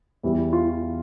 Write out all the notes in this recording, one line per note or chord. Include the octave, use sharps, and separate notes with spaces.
E2 E3 G3
F4